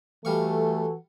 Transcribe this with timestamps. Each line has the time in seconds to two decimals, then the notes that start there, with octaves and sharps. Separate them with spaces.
0.25 E3 G3 A3 F#4 A4 F5 C#6